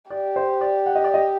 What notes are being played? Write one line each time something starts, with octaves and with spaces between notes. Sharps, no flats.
G4 D5
C5
D5
F#5
D#5
D5
D#5